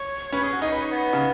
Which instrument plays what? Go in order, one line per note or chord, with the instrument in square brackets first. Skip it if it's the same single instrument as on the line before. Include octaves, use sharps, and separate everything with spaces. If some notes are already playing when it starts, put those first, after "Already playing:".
Already playing: [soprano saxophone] C#5
[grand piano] C#4 [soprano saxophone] B4
[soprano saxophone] G#4
F#4
[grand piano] D#4 [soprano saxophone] G#4
[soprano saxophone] B4
C#5
B3
[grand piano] C#3